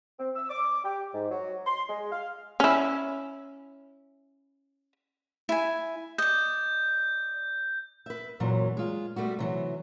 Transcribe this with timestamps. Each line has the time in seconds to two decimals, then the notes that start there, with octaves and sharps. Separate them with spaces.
0.19 C4
0.36 E6
0.50 D6
0.85 G4
1.14 G#2
1.31 F#3
1.67 C6
1.89 G#3
2.12 F5
2.60 C#4 E4
5.49 E4 G#5
6.18 D5 D#5 G6
8.06 B4 E5
8.40 F#2 A#2 E3 F#3 C5
8.77 G#3 F4
9.16 G3 A3 B3 F#4
9.39 C3 E3 F#3